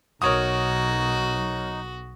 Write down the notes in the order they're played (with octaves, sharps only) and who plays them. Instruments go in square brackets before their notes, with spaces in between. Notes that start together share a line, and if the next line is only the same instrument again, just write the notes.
[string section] B1 [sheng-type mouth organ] D#4 [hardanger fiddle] F#4 [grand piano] A#4 C#5 D#6